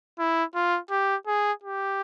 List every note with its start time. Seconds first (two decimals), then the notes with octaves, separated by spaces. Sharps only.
0.19 E4
0.55 F4
0.91 G4
1.27 G#4
1.64 G4